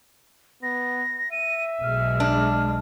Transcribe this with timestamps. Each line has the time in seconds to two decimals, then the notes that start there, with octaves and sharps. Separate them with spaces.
0.63 B3 A#6
1.31 E5 D#7
1.83 B1 G#3 F6
2.20 D4